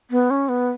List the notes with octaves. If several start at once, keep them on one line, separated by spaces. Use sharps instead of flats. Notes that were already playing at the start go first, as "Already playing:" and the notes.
B3
C#4
B3